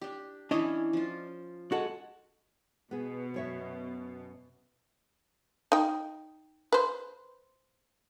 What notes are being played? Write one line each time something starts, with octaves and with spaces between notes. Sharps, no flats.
D4 G4
E3 C#4 D4 E4 C#5 D#5
F3 F4
G#3 F#4 A4 F#5
B2 B3 G#4
F#2 C#5 E5
D#4 G5
B4 C5